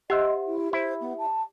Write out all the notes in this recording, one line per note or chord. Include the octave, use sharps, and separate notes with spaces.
G4 C5 D#5 E5 F#5
E4
E4 C5
B3
A5